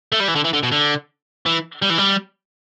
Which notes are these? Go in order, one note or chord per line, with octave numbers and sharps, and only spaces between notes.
A3
G3
E3
D3
E3
D3
B2
D3
E3
G3
E3
G3